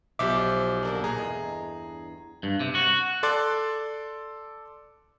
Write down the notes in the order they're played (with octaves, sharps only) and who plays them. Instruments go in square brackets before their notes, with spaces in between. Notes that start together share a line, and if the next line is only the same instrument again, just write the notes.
[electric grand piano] B1 E5 [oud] F3 D#4 [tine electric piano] G4 D6
[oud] D3 A#3 D4
[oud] A#2 [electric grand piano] G#4 [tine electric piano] A#5
[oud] E2 G2 D#5
[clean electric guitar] G2
C3
F#4
[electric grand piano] A4 D5 C6 D6 F#6 A6